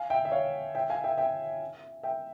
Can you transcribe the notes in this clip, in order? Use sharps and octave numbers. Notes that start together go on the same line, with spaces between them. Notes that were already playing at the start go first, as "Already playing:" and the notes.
Already playing: F5 G#5
E5 G5
E5
C#5 F5
E5 G5
F5 G#5
E5 G5
E5 G5
E5 G5